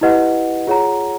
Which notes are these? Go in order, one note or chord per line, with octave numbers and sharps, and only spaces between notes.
E4 G4 B4 D#5 F#5
F4 G#4 C#5 F#5 A#5